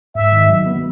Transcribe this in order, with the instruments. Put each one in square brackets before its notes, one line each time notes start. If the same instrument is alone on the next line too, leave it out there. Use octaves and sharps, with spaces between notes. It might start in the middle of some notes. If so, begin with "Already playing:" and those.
[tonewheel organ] G#2 [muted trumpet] E5
[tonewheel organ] D#3
F#3
B3